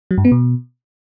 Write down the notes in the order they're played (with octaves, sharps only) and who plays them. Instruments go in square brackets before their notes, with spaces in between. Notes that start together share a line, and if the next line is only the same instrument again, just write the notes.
[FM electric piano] F#3
G2
B3
B2